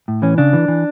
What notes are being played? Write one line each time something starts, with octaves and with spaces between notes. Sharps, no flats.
A2
E3 C#4
C#3 D4
E3
E3